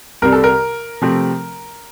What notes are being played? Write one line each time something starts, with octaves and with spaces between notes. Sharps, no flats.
C2 C3 G3 A#4
A4
A#4
C3 F3 A3 C4